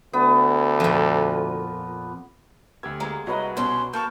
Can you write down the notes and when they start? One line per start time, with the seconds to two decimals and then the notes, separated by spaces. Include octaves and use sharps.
0.13 D2 B3
0.80 F2 A#2
2.83 D2 G4 E6 G#6
3.00 G#3 A#3 A#5 E6
3.27 C2 F#3 B4 D#5 F#5
3.57 B2 C#4 C6
3.94 A#3 A5 C#6 F6 G6